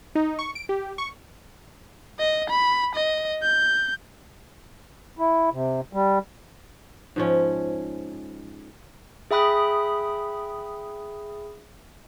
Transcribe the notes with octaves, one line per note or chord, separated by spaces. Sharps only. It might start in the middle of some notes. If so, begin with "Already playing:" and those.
D#4
C#6
D7
G4
C#6
D#5
B5
D#5
G6
E4
C3
G3
G#2 F3 C#4
G#4 E5 G5 B5 D#6 F#6